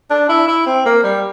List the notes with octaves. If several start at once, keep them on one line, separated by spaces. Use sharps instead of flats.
D4
E4
E4
C4
A#3
G3